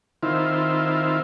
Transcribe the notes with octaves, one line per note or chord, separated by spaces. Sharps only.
D#3 C4 E4 F4